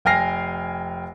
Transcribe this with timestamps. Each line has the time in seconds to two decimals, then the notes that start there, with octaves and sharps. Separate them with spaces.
0.05 F1 G5 G#5 F6 A#6 C7